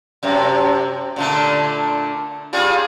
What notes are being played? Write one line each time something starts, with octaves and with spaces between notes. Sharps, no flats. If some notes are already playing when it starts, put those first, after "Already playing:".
F#2 C3
A#2 D3 A3
G3 F4 G#4